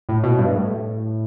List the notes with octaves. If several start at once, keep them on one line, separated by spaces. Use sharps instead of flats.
A2
B2
G2
G2
A2